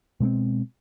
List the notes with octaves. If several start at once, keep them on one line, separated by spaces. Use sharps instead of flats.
B2 G#3 A#3 C4